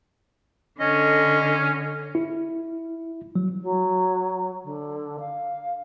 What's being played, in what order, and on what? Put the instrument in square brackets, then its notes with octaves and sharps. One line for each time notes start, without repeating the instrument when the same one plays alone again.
[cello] D3 [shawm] C#4 [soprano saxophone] D#5
[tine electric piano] E4
F#3
[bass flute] F#3
D3
F5